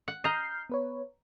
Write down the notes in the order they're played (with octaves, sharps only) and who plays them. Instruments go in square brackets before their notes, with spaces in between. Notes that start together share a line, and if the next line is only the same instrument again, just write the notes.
[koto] F#5
[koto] D#5 A#5 [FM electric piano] F6 G6 C7
[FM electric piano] B3 B4 C#5